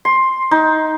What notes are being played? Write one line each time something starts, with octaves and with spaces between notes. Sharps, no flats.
C6
D#4